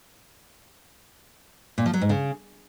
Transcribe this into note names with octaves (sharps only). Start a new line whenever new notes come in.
A#2
F3
F#3
G#2
C#3